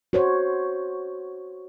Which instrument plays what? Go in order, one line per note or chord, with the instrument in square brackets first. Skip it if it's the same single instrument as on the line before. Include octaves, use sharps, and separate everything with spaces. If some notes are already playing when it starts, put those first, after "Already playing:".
[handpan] F#4 C5 C#5